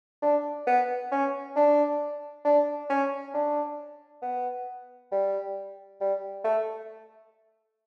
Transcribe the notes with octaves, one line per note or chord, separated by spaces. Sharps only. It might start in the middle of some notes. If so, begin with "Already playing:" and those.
D4
B3
C#4
D4
D4
C#4
D4
B3
G3
G3
A3